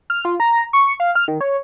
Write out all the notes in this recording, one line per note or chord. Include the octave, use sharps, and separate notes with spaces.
F6
F4
A#5
C#6
F5
F6
D#3
C#5